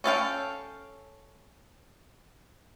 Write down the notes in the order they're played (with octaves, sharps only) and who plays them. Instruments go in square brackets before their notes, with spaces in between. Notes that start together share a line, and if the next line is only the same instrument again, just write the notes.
[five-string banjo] C#4 A4 F5 G5